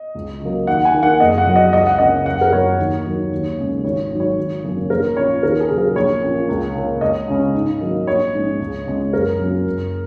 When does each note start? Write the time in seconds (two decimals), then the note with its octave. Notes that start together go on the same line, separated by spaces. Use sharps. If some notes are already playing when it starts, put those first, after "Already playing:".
Already playing: D#5
0.15 C#2
0.41 C#3 F#3 A#3
0.67 D#2 F#5
0.85 G#5
0.94 D#3 A#3
1.03 F#5
1.20 F#1 D#5
1.38 F#5
1.47 F#2 F#3
1.56 D#5
1.73 C#2 D#5
1.87 F#5
1.98 C#3 A#3 C#4 D#5
2.26 F#1 F#5
2.41 A#4
2.53 F#2 F#3 C#5
2.79 D#2
3.05 D#3 F#3
3.32 D#2
3.58 C#3 G#3 C#4
3.84 G#1 C#5
4.11 G#2 F#3
4.20 C#5
4.38 G#1
4.64 F#2 C#3 A#3 C#4
4.90 A#1 A#4
5.17 A#2 A#3 C#4 C#5
5.43 D#2 A#4
5.60 G#4
5.69 C#3 F#3
5.78 A#4
5.96 A#1 C#5
6.22 A#2 A#3 C#4
6.49 C#2
6.75 C#3 A#3
7.01 C#2 D#5
7.28 C#3 G#3 C#4
7.54 G#2
7.81 D#3 F#3 A#3
8.07 A#1 C#5
8.33 G#2 G#3 C#4
8.60 C#2
8.86 C#3 G#3 C#4
9.13 F#1 A#4
9.39 F#2 F#3 A#3 C#4
9.66 F#1